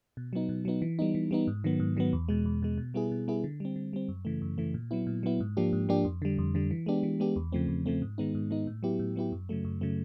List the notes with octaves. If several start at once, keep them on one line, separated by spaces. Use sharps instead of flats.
B2
F#3 B3 D#4
B2
F#3 B3 D#4
E3
G3 B3 D#4
E3
G3 B3 D#4
G#2
D#3 F#3 B3
G#2
D#3 F#3 B3
E2
B2 G#3
E2
B2 G#3
B2
G3 B3 E4 G#4
B2
G3 B3 E4 G#4
D3
G3 C4
D3
G3 C4
F#2
C#3 E3 A3
F#2
C#3 E3 A3
A#2
F#3 B3 E4
A#2
F#3 B3 E4
G#2
F3 A#3 D4 G4
G#2
F3 A#3 D4 G4
F2
D3 G3
F2
D3 G3
E3
G#3 B3 D4 G4
E3
G#3 B3 D4 G4
E2
C#3 F3 A3 C4
E2
C#3 F3 A3 C4
G#2
D#3 G#3 B3 D#4
G#2
D#3 G#3 B3 D#4
A2
F#3 B3 E4 G4
A2
F#3 B3 E4 G4
F#2
C#3 F#3 A3
F#2
C#3 F#3 A3